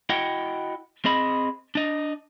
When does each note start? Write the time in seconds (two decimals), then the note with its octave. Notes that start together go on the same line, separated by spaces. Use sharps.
0.09 E4 F#4 D#5 F#5 G5
1.05 C4 G#4 D#5 B5
1.75 D4 D#5